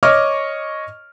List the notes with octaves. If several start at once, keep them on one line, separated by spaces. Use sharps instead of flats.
C#5 D#5 C#6 D6 F6